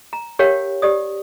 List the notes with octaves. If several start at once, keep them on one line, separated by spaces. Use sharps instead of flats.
A#5
G4 A#4 C#5 F5 G5
G4 D5 D#6